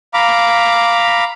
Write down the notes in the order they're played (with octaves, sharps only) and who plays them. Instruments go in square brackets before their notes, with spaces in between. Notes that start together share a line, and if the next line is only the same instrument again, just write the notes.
[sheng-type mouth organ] F5 A#5 B5 D6